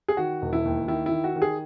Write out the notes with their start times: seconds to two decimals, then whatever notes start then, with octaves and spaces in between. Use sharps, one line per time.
0.08 G#4
0.17 D#3 F#4
0.42 E1
0.53 E4
0.65 D#2
0.88 D#3 E4
1.06 E4
1.12 D#3
1.24 F#4
1.36 D#3
1.42 G#4